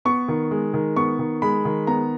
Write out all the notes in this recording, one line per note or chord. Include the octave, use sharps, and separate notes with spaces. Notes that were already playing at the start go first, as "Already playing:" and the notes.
B3 C#6
D#3
G#3
D#3
B3 C#6
D#3
G#3 B5
D#3
B3 A#5